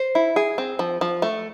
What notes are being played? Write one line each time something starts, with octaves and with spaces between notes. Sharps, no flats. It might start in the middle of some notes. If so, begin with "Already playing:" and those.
Already playing: C5
E4
G#4
C4
F3
F3
A3